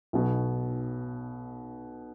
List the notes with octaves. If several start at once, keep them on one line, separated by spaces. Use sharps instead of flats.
B1 B2